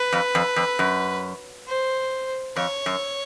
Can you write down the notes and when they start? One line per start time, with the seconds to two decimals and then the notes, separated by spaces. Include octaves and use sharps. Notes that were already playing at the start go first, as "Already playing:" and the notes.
Already playing: B4
0.13 F2
0.35 F2
0.56 F2
0.79 F#2
1.67 C5
2.56 F2 C#5
2.86 F#2